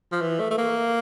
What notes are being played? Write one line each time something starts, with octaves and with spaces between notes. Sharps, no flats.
F3
E3
A3
A3
A#3